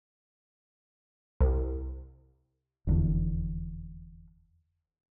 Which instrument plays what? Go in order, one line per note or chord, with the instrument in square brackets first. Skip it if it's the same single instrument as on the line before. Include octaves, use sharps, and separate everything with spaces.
[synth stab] C2
[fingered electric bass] F1 E2 D3